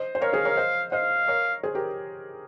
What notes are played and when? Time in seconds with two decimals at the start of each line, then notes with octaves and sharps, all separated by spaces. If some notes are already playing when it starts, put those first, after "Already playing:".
Already playing: C5 D#5
0.15 C5
0.21 A#4 C#5 F5
0.33 G#4 C5
0.45 A#4 C#5
0.57 C5 D#5
0.92 C5 D#5 F5
1.28 A#4 C#5
1.63 G#4 C5
1.75 G4 A#4